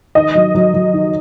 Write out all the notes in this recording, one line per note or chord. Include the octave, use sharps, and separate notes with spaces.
D#3 D#5
F#3
F#3
F#3
D#3